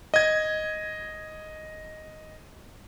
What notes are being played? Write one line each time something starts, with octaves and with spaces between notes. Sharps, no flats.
D#5 G#6